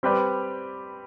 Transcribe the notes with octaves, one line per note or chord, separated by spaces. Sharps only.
G3 C4 G4 B4 D5